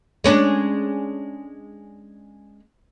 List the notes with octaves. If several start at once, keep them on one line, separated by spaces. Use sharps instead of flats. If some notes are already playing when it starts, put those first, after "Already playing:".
G#3 C#4 D4